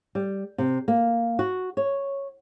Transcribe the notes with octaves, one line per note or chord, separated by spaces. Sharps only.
G3
C3
A#3
F#4
C#5